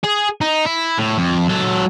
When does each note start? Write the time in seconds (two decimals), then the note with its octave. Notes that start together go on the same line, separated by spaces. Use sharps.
0.04 G#4
0.41 D#4
0.65 E4
0.98 A2
1.18 F2
1.48 F#3 A4